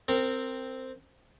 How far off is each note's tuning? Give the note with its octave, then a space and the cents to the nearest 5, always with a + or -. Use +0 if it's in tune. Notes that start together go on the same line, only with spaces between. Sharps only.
C4 +0 A#4 -25